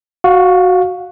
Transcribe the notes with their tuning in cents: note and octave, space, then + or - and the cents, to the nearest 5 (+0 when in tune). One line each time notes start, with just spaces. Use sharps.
F#4 +0 F5 +20